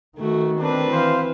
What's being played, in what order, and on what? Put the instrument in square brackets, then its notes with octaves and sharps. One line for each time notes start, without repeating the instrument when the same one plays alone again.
[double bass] D#3 [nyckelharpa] A3 F#4
[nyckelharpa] C4 B4 [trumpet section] D4
[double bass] E3 [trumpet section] C5 F5